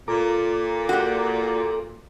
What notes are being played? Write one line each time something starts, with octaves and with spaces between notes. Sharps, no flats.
A#2 A4 A#5 D6
F#4 G4